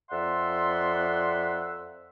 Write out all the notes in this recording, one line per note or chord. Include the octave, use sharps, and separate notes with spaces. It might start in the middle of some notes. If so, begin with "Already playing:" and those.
F2 D5 E5 F#5 C6